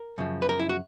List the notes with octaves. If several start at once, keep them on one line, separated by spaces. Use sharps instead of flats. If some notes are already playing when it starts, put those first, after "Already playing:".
Already playing: A#4
F#2 C#3 F3
B4
A#4
E4
F#4